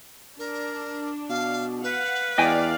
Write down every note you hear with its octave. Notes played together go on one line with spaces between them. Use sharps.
D4 A#4
B2 F5
B4 F5 F#5
E2 D5 D#5 F5 G5 G#5